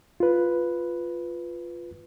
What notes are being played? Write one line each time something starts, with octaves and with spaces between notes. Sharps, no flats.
F4 B4